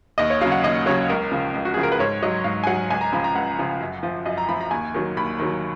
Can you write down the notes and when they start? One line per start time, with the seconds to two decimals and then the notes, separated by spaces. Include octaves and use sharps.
0.18 D#2 D#5
0.30 C#5
0.41 C#3 F#3 F5
0.52 F#5
0.63 D#2 D#5
0.86 C#3 F#3 C#5
1.09 C#2 A#4
1.32 C#3 F3
1.54 C#2
1.65 F#4
1.74 C#3 F3 G#4
1.83 A#4
1.92 B4
1.99 G#2 C#5
2.23 F#3 D#5
2.44 G#2 F5
2.64 G#5
2.67 F#3 F#5
2.90 C#2 G#5
3.01 A#5
3.13 C#3 F3 B5
3.24 A#5
3.35 C#2 F#5
3.59 C#3 F3
3.80 F#2
4.03 F3
4.26 F#2 D#5
4.38 A#5
4.49 F3 B5
4.61 A#5
4.71 D#2 G#5
4.94 D#3 F#3
5.17 D#2 B5
5.39 D#3 F#3